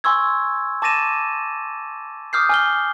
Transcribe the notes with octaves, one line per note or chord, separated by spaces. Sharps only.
G#5 C6 C#6 E6 G#6
A5 D6 A6 A#6 D#7 E7
D6 D#6 F6 G6 C7
G#5 F6 G7